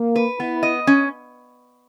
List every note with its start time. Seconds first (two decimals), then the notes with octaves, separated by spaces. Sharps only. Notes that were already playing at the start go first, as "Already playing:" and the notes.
Already playing: A#3
0.16 B4
0.40 B3 E4
0.63 D#5
0.87 C#4